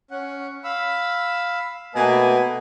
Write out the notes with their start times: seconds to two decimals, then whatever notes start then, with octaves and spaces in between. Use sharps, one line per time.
0.11 C#4 F#5
0.64 F5 B5 E6
1.95 B2 A3 A#3 B4 D#5 G#5